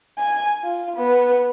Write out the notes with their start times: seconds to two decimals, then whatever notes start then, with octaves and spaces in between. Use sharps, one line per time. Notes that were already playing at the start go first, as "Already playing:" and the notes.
0.18 G#5
0.63 F4
0.97 B3